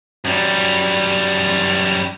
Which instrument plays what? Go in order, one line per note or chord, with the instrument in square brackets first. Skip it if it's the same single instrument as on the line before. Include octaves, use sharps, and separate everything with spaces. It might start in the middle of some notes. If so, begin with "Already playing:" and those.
[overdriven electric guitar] F#2 G3